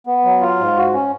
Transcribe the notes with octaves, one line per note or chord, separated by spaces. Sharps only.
B3
F#3
F4
G#2
F#4
C#4